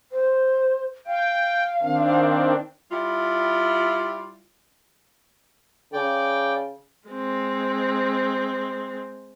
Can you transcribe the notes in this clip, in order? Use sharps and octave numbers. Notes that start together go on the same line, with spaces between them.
C5
F5 G5
D#3 C4 D4
G3 E4 F4
C#3 D5 G5
G#3 C4